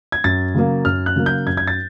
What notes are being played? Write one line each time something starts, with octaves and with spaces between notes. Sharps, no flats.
G#6
F#2 A6
C#3 F#3 A#3
F#2 F6
F#6
C#3 F#3 A#3
G6
F#2 G#6
G#6
A6